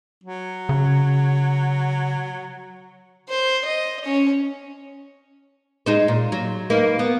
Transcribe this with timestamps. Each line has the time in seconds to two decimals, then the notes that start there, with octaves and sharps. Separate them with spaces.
0.24 F#3
0.69 C#3
3.29 C5
3.65 D#5
4.04 C#4 C#5
5.86 G#3 D#4 C5
6.08 A#2
6.32 F#3
6.70 A#3 D#4 B4
6.99 B3